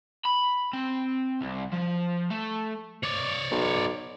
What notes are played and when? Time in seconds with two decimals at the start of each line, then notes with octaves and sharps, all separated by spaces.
0.25 B5
0.73 C4
1.42 C2
1.73 F3
2.30 A3
3.03 C#5 D5
3.51 B1